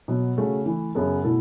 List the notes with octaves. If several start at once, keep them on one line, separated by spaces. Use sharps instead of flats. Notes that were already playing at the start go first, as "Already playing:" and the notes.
B2 F#3 B3
C#3 A3 F#4
E3 A3 E4
F#2 C#3 F#3 B3 A4
B2 A3 E4 A4